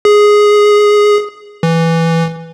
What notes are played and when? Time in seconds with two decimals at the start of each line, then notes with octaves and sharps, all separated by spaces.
0.05 G#4
1.63 E3